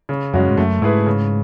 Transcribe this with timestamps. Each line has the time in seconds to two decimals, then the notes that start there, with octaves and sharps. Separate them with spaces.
0.09 C#3
0.34 F#2 G#3 C#4 F#4
0.50 G#2
0.57 F#2 A3
0.82 G#2 E4 G#4 B4
1.06 C#3